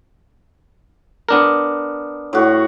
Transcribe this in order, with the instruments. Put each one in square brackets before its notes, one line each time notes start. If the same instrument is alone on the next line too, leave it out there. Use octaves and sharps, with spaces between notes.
[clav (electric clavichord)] B3 D4 A#4
[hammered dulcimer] A2 F#4